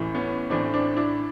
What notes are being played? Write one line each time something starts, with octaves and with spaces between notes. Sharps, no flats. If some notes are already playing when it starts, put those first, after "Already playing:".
Already playing: A1 A2 E3
B3 C#4
A1 A2 E3 C4 D4
C4 D4
D4 E4